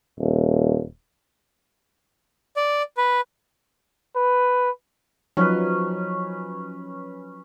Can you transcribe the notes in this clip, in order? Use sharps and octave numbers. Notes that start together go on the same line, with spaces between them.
D#1
D5
B4
B4
F3 F#3 C#4 D#4 B4